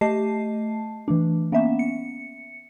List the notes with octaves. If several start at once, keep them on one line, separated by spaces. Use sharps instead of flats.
A3 G4 D#5 A5 C7
E3 A3 D4
A#3 B3 C#4 E5
C#7